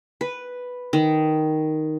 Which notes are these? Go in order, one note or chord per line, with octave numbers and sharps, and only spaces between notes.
B4
D#3